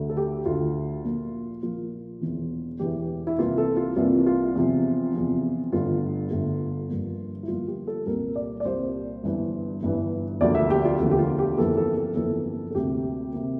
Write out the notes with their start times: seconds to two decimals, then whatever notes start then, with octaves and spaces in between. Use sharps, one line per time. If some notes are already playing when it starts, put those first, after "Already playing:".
Already playing: D2 D3 A3
0.09 A4
0.17 G4
0.45 D2 D3 A3 F4
1.04 A#1 A#2 F3 A#3
1.63 A#1 A#2 F3 A#3 F4
2.21 E1 E2 E3
2.79 E1 E2 E3 G4
3.27 E4
3.38 C2 C3 E3 A#3 F4
3.58 A4
3.77 F4
3.96 C2 C3 E3 A#3 F4
4.26 F4
4.55 E2 C3 F3
5.14 E2 C3 F3
5.72 G1 G2 D3 A3 F4
6.31 G1 G2 D3 A3
6.89 G1 G2 F3 A#3
7.43 E4
7.48 G1 G2 F3 A#3 F4
7.67 G4
7.87 A4
8.06 C2 A#2 G3 A#3 A#4
8.36 D5
8.60 D5
8.65 C2 A#2 G3 A#3 C5
9.23 G1 G2 E3
9.82 G1 G2 E3
10.41 E1 D2 D3 F3 A#3 D5
10.55 E5
10.70 G4
10.85 F4
11.00 E1 D2 D3 F3 A#3
11.11 G4
11.19 F4
11.39 G4
11.57 G1 F2 E3 A#3 A4
11.77 A4
11.97 A4
12.16 G1 F2 E3 A#3 A4
12.71 A4
12.75 D2 C3 G3 A#3 G4
13.33 C3 G3 A#3